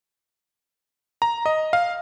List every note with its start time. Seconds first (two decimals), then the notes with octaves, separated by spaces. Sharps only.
1.22 A#5
1.46 D#5
1.73 F5